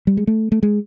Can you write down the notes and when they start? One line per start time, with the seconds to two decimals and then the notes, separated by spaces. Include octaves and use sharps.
0.07 G3
0.17 G#3
0.27 A3
0.52 A3
0.63 G#3